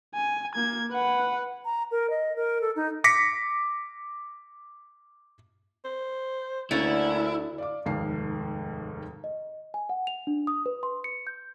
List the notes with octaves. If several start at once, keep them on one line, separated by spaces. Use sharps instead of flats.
G#5
A#3 G#6
B4 F#5
A#5
A#4
D#5
A#4
A4
D#4
D6 A#6 B6 C#7
C5
D2 A3 A#3 C#4 D4 E4
D5 F5 D6
F1 D#2 G#2 F5 C7
D#5
G#5
F#5
F7
D4
D#6
B4
C6
C#7
G6